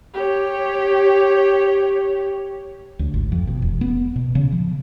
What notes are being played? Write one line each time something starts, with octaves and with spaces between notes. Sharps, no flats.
G4 C#5
D2
G#1
F2
B2
E1
B3
B2
C#3
F3